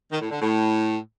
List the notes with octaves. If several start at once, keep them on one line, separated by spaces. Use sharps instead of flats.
D#3
A2
D3
A2